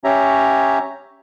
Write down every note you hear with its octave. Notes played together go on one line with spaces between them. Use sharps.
C#4 G4 C#5 E5 A#5